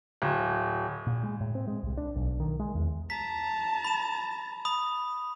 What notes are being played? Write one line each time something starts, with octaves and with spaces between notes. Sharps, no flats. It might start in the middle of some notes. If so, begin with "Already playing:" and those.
D1
A#2
G#3
A2
C4
G#3
C2
D4
B1
D#3
G#3
E2
A5 A#5 B6
B5 E7
B5 D#6